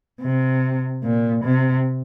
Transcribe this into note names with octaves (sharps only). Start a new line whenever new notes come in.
C3
A#2
C3